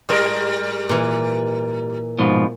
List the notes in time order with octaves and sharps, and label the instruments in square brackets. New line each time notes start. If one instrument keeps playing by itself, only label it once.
[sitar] G#2 G3 A#4 [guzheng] G#4
[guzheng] A#2 E3
[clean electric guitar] G#2 B2 F3